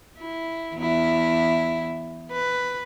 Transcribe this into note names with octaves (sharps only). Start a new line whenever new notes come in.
E4
E2 E4
B4